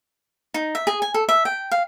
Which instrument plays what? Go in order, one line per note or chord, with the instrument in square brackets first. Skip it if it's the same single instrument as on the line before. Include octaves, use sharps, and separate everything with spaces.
[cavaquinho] D#4
E5
G#4
G#5
A4
E5
G5
F5